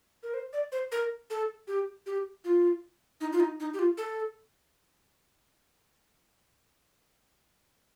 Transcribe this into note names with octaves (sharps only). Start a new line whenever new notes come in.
A#4
C5
D5
C5
A#4
A4
G4
G4
F4
D#4
F4
D#4
D#4
G4
F4
A4